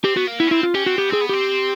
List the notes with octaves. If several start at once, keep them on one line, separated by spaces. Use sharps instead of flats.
C4 G4
B3 F#4
A#3
B3 E4
C#4
C4 E4
F4
C#4 G4
C4 F#4
B3 G4
C4 G#4
B3
C4 G4